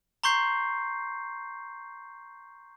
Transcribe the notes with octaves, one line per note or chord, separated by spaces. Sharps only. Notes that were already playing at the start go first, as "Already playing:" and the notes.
A#5 C6 C#6 G6 C7